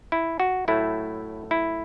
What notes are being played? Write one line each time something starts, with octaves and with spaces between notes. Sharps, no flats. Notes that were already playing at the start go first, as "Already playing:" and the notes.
E4
F#4
A2 F#3 A3 E4
E4